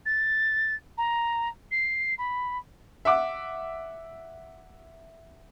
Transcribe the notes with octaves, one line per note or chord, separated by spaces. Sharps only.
A6
A#5
C7
B5
E5 F#5 D6